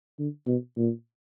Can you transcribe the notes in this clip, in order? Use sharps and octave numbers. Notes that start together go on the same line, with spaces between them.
D3
B2
A#2